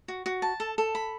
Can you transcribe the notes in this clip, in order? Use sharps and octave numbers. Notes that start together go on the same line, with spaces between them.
F#4
F#4
A5
A4
A4
B5